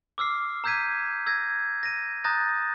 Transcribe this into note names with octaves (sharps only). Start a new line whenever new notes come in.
D6 E6 F6 C7
A#5 E6 G6 G#6 B6 D#7
E6 G#6 A#6
A#6 D#7
A#5 D#6 F#6 G6 A6 A#6